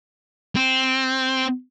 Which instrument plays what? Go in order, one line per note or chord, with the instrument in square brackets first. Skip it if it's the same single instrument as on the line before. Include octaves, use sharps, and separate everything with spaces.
[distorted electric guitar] C4